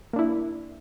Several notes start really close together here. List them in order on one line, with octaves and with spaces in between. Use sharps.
A#3 D4 E4